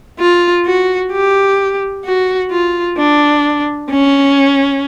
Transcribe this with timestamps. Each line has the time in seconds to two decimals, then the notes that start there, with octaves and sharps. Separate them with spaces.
0.19 F4
0.65 F#4
1.12 G4
2.05 F#4
2.51 F4
2.97 D4
3.90 C#4